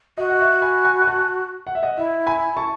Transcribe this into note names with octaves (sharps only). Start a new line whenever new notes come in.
F#4 D#5
F#5
E5
G#5 B5
G#5 B5
G#5
F#5 A5
F#5
E5
D#5 F#5
E4 E5
G#5 B5
A5 C#6